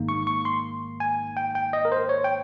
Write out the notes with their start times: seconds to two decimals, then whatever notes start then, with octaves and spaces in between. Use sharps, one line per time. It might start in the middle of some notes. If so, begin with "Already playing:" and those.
Already playing: G#1 G#2 D#3 A#3
0.09 C#6
0.27 C#6
0.45 C6
1.00 G#5
1.37 G5
1.55 G5
1.73 D#5
1.85 A#4
1.92 C5
2.09 C#5
2.24 G5